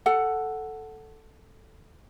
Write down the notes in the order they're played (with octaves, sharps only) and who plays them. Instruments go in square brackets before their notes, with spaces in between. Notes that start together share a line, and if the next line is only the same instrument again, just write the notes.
[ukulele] A4 F#5